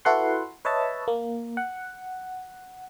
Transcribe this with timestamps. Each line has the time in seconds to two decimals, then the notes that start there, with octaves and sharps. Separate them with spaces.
0.05 E4 F#4 A4 B4 F#5 C6
0.65 B4 C#5 D#5 E5 A5
1.08 A#3
1.57 F#5